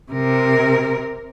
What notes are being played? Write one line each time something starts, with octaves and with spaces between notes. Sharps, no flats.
C3 A#4